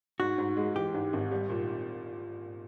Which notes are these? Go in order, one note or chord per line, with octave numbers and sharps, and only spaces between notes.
G#2 F#4
G#2
G#3
E3 G4
G#2
G#1
G3
A#2